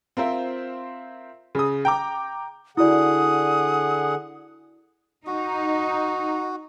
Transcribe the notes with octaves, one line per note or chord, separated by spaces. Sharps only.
C4 F4 A#4 C5 E5
C#3 D#6
G5 A#5 D6
D3 E4 F#4 G#4 D5 F#5 D#6
D#4 F#4